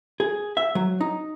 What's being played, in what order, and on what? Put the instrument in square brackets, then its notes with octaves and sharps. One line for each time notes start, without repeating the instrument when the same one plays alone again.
[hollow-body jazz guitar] G#4
E5
F#3
D#4